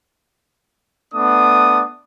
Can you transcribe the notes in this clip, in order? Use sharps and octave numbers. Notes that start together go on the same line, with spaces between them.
A3 B3 D4 D#6